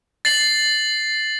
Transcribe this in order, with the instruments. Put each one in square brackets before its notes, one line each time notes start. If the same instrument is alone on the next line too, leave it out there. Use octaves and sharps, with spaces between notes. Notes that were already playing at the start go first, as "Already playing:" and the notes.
[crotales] A6 C7 F#7